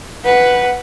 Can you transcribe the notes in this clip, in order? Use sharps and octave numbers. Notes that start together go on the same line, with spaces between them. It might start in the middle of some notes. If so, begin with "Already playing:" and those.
B4 F#5